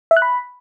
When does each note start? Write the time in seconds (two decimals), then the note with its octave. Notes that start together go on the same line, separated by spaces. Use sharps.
0.11 E5
0.17 F#6
0.22 B5